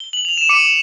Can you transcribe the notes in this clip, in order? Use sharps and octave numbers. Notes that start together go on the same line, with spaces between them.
G7
F#7
F7
E7
D6 C#7 D#7